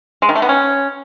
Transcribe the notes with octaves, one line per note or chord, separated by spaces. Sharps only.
G#3
D#3
A3
B3
C#4